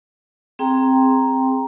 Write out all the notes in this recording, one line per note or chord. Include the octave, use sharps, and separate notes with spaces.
C4 G#4 G5 A#5 C6